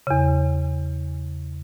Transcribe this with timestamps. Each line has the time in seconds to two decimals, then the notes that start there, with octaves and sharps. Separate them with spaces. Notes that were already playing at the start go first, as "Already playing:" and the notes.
0.07 E2 C#3